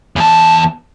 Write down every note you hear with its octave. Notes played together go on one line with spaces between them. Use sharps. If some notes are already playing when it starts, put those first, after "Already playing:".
E2 A5